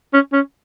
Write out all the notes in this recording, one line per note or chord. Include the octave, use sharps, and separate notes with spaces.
C#4
C#4